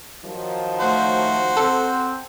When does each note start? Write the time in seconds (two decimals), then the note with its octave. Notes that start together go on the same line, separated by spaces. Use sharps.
0.24 D#3 F3 F#3
0.80 A3 F#4 C5
1.57 C4 A4